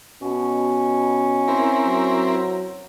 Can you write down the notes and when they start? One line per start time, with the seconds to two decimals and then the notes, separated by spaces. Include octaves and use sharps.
0.22 B2 C#4
1.48 C4 E4 A#4
1.85 F#3